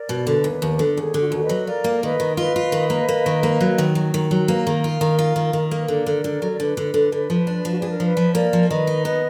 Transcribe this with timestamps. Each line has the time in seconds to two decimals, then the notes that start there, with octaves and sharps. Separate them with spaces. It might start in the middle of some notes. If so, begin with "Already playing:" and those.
Already playing: A#4 D5
0.09 B2
0.26 D3 B4
0.44 D#2
0.62 D#2
0.79 D3
0.97 D#2 G#4
1.14 D3
1.21 F#4
1.28 F4
1.32 D#2 F#4
1.43 B4 D#5
1.49 F#3
1.67 F4 A#4 D5
1.84 A#3
2.02 D#3 B4 D#5
2.20 D#3
2.37 F4 B4 D#5
2.56 F4
2.72 D#3
2.90 A#3
3.09 A#3
3.26 D#3
3.43 A#3
3.61 F#3
3.78 D#3
3.95 F#3
4.14 D#3
4.31 F#3
4.48 A#3 B4
4.57 A#4
4.65 D#3 G#4
4.73 A#4
4.84 F4
5.01 D#3
5.19 F4
5.36 D#3
5.53 D#3
5.71 A#3
5.80 B4
5.88 D3 A#4 D5
6.06 D3
6.24 D3
6.42 F#3
6.51 D5
6.60 D3 B4
6.77 D3
6.94 D3
7.12 D3
7.30 F3
7.47 D4
7.65 F3 F#4
7.78 D4 G#4
7.90 A#4
8.00 F3 B4
8.17 F3
8.34 A#3 A#4 D5
8.53 F3
8.69 D#3 B4 D#5
8.87 D#4
9.05 B3 B4 D#5